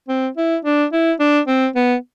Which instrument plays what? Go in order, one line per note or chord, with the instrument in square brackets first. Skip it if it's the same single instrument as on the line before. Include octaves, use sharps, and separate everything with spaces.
[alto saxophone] C4
E4
D4
E4
D4
C4
B3